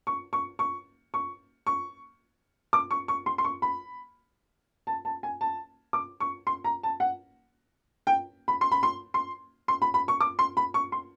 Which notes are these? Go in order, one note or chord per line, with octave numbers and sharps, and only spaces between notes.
C#6
C#6
C#6
C#6
C#6
D6
C#6
C#6
C6
C6
C#6
B5
A5
A5
G#5
A5
D6
C#6
C6
A#5
A5
F#5
G5
B5
C6
B5
C6
C6
C6
B5
B5
C#6
D6
C6
B5
C#6
C6